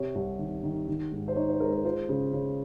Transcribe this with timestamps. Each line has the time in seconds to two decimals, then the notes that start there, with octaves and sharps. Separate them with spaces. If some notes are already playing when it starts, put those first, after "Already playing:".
Already playing: C3 C#5
0.15 C2
0.39 D#3
0.63 D#3
0.88 D#3
1.12 G#2
1.28 C5
1.36 D#4 C#5
1.49 C5
1.60 G#3 A#4
1.73 A#4
1.85 F4 C5
2.09 C#3
2.33 C#3